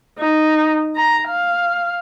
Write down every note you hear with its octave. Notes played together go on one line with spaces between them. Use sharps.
D#4
A#5
F5